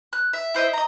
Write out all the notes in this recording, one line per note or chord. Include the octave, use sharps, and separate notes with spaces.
F#6
E5
E4 C5 D#5 E5
D#5 A#5